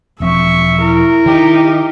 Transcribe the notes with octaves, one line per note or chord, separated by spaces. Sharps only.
E1 F3 C4 E5 C#6
E4 A#4
D#3 D#4 G4